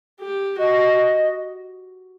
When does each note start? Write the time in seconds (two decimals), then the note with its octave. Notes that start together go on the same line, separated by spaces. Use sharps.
0.21 G4
0.58 F#4 D#5